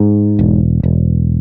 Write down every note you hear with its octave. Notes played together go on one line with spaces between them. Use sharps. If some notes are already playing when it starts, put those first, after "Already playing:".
Already playing: G#2
E1
E1